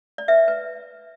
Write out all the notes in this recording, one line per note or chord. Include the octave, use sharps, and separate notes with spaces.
D5
B4 E5
B4